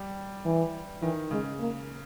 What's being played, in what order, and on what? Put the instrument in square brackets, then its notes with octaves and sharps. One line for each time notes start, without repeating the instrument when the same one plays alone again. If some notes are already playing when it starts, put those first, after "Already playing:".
Already playing: [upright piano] G3
[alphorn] E3
[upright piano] D#3 [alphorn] E3
[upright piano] C#3 [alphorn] G#3
[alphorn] A#3